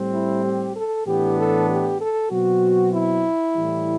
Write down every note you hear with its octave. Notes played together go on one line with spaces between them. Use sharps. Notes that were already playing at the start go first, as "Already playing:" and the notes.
Already playing: A2 G3 C4
E4
G4
A4
A2 E3 B3 D4 G4
A4
G4
A4
B2 F#3 C4 F#4
E4
A2 E3 G3